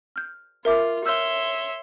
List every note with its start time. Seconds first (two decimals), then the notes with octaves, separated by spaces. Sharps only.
0.16 F6 G6
0.65 F4 A#4 E5 D6
1.06 C#5 E5 C6 E6 F6 G6